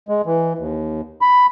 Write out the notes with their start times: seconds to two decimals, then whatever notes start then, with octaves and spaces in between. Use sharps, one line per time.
0.09 G#3
0.26 E3
0.58 D#2
1.22 B5